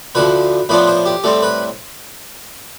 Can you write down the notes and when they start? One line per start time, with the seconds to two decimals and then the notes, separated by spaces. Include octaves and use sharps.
0.15 D2 D3 F3 B4
0.69 A2 F3 B3 D4 F4 B4
0.87 C5
1.06 G4
1.24 A2 G3 C4 A4
1.42 B4